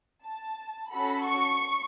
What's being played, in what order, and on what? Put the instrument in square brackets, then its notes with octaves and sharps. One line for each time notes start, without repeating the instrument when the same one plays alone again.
[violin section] A5
C#4 F#4 A4 B5
C#6